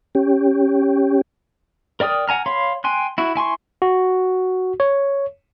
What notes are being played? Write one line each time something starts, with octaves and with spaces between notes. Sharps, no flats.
C#4 G4
A#4 D5 G5 D#6 F6
F#5 G#5 A#5 F6
C#5 F5 B5 C6
G5 G#5 C6 F#6
E4 F#4
E4 G#5 C6 C#6
F#4
C#5